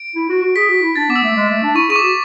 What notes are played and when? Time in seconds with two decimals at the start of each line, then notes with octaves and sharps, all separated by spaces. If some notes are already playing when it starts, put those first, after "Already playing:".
Already playing: D7
0.15 E4
0.29 F#4
0.42 F#4
0.56 G#4 B6
0.69 F#4
0.82 E4
0.96 D4 A6
1.09 B3 D6
1.16 E6
1.23 A3
1.36 G#3
1.49 A3
1.63 D4
1.75 E4 C#6
1.89 G#4 C#6
1.96 D6
2.02 F#4